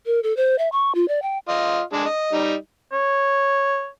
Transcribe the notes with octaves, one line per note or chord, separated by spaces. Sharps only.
A#4
A4
C5
E5
C#6
F4
D5
G5
F4 D#5
G#3 D4 G#4
D#5
G3 D#4
C#5